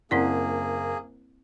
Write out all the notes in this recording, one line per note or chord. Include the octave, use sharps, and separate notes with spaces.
F#1 A#3 C4 E4 G#4 D5 F#5